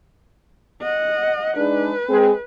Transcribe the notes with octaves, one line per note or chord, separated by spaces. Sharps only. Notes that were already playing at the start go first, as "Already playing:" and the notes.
D#5 F#5
G#3 D4 D#4 B4
G#3 C4 G#4